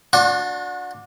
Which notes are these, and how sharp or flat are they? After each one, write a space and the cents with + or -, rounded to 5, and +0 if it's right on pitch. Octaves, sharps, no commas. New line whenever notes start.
D4 +0 F#4 -30 C6 +40